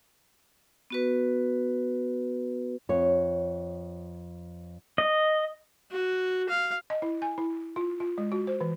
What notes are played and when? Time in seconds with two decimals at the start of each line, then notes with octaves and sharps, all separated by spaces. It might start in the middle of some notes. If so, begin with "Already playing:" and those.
0.90 B3 F#4 B4
2.89 F2 C#5
4.98 D#5
5.91 F#4
6.49 F5
6.90 D#5
7.02 E4
7.22 G#5
7.38 E4
7.76 F4
8.00 F4
8.18 G#3
8.32 F#4
8.47 C5
8.61 E3